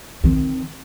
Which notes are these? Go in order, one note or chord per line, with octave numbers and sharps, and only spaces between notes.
D#3 C4